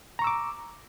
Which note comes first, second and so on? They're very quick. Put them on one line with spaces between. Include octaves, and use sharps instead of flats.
A#5 C#6 E6 D6